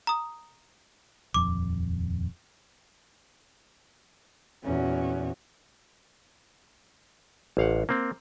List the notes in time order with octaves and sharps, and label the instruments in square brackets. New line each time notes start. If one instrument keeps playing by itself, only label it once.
[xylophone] A#5 D#6
[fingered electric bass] D#1 F2 [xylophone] D6
[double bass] E2 A#2 [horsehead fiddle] C#4 F#4
[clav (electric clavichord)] A1 F5 F#5
A#3 C4